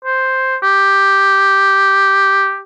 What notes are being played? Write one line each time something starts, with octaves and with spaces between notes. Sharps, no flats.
C5
G4